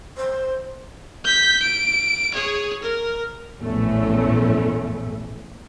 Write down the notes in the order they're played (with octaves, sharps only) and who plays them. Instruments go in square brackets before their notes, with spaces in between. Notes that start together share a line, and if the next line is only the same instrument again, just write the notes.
[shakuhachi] C5
[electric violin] G6 B6
D7
G#4 C#5
A#4
[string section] A#1 E2 A2 A3 C#4